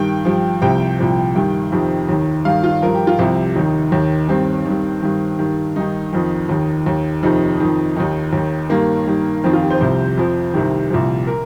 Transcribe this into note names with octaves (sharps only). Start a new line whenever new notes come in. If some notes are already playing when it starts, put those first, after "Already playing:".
Already playing: G2 D#3 G5
G2 F3
C2 C3 F3 G5
C2 A#2 F3
G2 D#3 G5
F2 C3 D#3
D#2 D#3
G2 D#3 F5
F4
G2 F3 A#4
G4
F4
C2 C3 F3 G4
D#2 D#3 D#4
D#2 D#3
G2 D#3 C4
G2 D#3
G2 D#3
G2 D#3
G2 D#3 D#4
F2 D#3
D#2 D#3
D#2 D#3
F2 C3 D#3 D#4
F2 D#3
D#2 D#3 D#4
D#2 D#3
G2 D#3 A#3
G2 D#3
F2 D#3 C4
F4
G4
C5
C2 C3 F3 C5
F2 F3
C2 C3 D#3
C2 A#2 F3
A#4